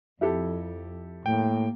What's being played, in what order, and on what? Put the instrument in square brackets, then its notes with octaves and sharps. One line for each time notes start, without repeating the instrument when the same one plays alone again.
[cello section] F2 [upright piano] E4 G4 A4
[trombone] A2 [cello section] A#3 [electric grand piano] G5